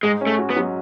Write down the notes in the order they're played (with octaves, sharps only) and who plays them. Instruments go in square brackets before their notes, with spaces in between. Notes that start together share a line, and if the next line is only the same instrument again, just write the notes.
[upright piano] G#2 [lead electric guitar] G#3
[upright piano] C#4
[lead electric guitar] A3
[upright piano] F#4
[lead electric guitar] B3
[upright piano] F#3